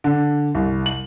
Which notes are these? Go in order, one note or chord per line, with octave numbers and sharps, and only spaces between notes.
D3
C2
F#7